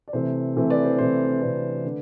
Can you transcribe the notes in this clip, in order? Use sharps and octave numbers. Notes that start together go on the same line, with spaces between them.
D5
C3 E3 A3 C4 C5
C3 E3 A3 C4
B4 D5
C5
C3 E3 A3 C4 C5
C3 E3 A3 C4 B4 D5
D3 A3